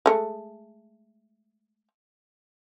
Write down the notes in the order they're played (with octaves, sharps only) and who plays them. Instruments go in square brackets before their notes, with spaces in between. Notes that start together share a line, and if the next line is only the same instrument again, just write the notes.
[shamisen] G#3 A3